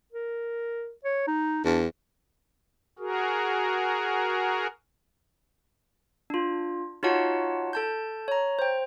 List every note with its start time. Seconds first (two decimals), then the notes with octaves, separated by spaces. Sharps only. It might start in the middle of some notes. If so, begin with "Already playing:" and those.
0.13 A#4
1.05 C#5
1.27 D#4
1.65 E2 D4
2.99 F#4 G#4 A#4
6.30 D4 F4
7.03 D#4 F4 F#4 C#5 F#5 A5
7.73 A4 A5 G6
8.28 C#5 A#5
8.59 C5 G5